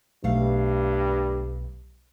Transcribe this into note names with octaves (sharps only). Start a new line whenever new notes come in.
B1 G2 A3 F5